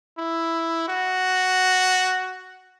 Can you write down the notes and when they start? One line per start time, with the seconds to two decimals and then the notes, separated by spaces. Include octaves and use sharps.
0.18 E4
0.88 F#4